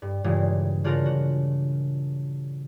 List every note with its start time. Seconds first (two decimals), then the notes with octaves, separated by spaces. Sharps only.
0.02 G2
0.24 G2 A#2 C#3 E3 G#3
0.84 C#3 D4 F4 F#4 A#4
1.05 F#4